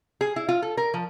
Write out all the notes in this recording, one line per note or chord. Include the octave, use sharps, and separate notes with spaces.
G#4
E4
F4
A4
A#4
F3